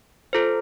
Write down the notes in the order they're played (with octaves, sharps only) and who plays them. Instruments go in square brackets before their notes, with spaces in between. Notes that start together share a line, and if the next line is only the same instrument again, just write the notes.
[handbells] F4 A4 C5